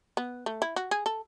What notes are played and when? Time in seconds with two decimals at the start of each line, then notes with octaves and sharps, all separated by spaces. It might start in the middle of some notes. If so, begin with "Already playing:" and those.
0.17 B3
0.46 A3
0.62 E4
0.76 F#4
0.91 G#4
1.06 A4